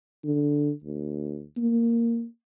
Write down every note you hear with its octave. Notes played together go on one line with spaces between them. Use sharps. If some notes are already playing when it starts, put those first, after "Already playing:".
D3
D2
A#3